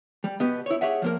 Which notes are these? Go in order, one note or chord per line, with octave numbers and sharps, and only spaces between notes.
G3
B2 B3 G4
E4 C#5
G4 G#4 C#5 E5 F#5
F3 A#3 A#4